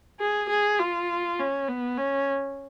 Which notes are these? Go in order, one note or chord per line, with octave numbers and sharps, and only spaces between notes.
G#4
G#4
F4
C#4
B3
C#4